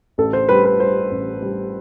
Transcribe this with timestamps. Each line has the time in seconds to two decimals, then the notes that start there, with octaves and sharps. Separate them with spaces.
0.18 A1 A4
0.33 C5
0.49 G3 B4
0.65 B4
0.80 G3 C5
1.11 A1
1.42 G3